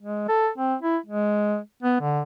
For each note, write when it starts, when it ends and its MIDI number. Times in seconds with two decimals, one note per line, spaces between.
0.02 0.28 56
0.29 0.50 69
0.58 0.75 60
0.82 0.97 64
1.06 1.58 56
1.83 1.97 59
2.01 2.22 50